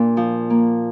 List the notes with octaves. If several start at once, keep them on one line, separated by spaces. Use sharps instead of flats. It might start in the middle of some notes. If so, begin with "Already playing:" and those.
Already playing: A#2 D4
F3
A#3